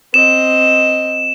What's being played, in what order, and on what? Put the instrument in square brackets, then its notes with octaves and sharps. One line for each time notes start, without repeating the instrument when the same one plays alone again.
[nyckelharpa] C4 D#5 [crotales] E7